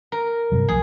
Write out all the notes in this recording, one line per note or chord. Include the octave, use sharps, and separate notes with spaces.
A#4
G2 C3 F#3
C2 F3 A3 G#4